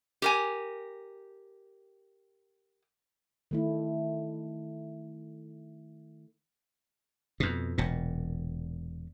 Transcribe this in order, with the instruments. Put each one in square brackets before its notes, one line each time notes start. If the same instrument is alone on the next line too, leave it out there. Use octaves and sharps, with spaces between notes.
[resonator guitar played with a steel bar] G4 A#4 G#5
[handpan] D#3 A3 E4
[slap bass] F2 B2
E1 A#2